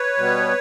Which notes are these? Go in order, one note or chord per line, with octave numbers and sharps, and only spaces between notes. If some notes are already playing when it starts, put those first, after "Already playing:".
Already playing: B4 C#5
B2 G3 B3